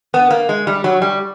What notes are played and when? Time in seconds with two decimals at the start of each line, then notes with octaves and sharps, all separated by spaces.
0.14 B3
0.30 A#3
0.49 G#3
0.67 G3
0.84 F#3
1.02 G3